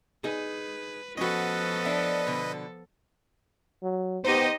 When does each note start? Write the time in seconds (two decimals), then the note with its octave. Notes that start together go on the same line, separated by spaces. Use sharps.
0.24 D#4 G#4 B4
1.17 F3 B3 C#4 F#4 A4 B4 D#5
1.85 D4 E5
2.27 B2 D3
3.83 F#3
4.24 B3 D#4 G4 C5 D#5